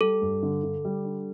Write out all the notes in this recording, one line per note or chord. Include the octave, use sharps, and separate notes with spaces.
G3 A4
G2
D3
D3
G3
D4